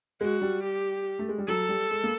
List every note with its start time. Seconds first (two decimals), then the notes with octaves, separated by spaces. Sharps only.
0.21 G#3 F#4
0.42 G3
0.64 G4
1.19 A3
1.29 G#3
1.38 G3
1.48 F#3 A4
1.69 G3
1.91 G#3
2.04 A#3